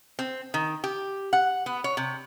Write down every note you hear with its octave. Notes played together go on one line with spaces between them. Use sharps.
C4
D#3
G4
F#5
B3
C#5
C3